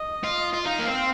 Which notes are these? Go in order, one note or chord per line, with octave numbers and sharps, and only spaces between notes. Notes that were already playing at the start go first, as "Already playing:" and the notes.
Already playing: D#5
F4
F4
D#4 F5
A#3
C4